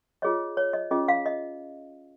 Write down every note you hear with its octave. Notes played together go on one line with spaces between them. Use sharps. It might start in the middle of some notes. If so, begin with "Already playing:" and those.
F4 G#4 C#5 D#5
C#5
D#5
C#4 F4 G#4 D#5
F5
D#5